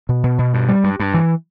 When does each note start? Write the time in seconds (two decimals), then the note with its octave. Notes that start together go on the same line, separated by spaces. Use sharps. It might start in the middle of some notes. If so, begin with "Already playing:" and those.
0.09 B2
0.24 B2
0.39 B2
0.54 G2
0.69 G3
0.84 G2
1.00 G2
1.14 E3